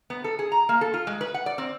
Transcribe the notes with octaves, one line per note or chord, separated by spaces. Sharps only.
B3
A4
G#4
A#5
A#3
A4
F4
G#3
B4
F#5
D5
C4